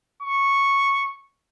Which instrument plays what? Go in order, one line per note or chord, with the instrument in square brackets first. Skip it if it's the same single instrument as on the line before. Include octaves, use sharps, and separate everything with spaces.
[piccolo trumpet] C#6